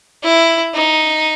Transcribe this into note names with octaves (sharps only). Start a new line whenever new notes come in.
E4
D#4